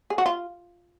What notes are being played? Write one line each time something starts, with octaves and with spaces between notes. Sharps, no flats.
G#4
F#4
F4